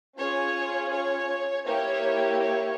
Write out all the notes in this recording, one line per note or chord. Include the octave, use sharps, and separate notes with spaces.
C#4 F4 G#4 C#5
C#5
A#3 E4 G4 C#5
C#5